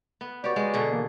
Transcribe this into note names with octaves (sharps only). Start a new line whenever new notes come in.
B3
B3 F#4 G4 C#5 D5
G#3 C#5
B2 D3 G#4
D#3 E3 A#3